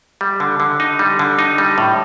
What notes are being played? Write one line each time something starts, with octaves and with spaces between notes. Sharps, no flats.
G3
D3
D3
D#4
G3
D3
D#4
G3
A2